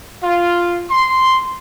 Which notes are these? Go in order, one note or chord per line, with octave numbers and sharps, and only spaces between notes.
F4
C6